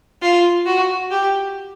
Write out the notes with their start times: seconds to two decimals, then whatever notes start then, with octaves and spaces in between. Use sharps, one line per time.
0.22 F4
0.66 F#4
1.11 G4